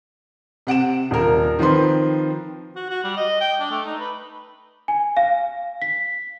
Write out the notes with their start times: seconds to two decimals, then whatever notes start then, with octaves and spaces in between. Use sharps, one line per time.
0.67 C3 F#5 D7 E7
1.11 D#1 A#4
1.59 D#3 F3 C4 B4 C6
2.76 F#4
2.90 F#4
3.04 G3
3.17 D#5
3.41 G5
3.60 D4
3.71 A3
3.86 D#4
3.99 B4
4.88 G#5
5.17 F5
5.82 B6